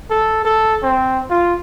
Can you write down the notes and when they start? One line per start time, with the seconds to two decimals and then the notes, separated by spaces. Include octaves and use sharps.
0.10 A4
0.45 A4
0.83 C4
1.30 F4